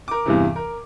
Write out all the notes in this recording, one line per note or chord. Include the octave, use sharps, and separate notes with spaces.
A#4 D6
E2 G2 C3 E3
A#4